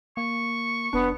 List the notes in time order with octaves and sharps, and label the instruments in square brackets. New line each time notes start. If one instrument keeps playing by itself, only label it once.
[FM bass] A#3 [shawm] C#6
[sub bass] F1 [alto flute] B3 [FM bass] D4